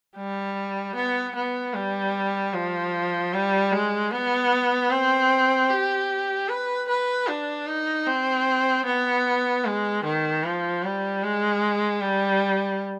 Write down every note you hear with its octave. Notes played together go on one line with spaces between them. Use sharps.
G3
B3
B3
G3
F3
G3
G#3
B3
C4
G4
B4
B4
D4
D#4
C4
B3
G#3
D#3
F3
G3
G#3
G3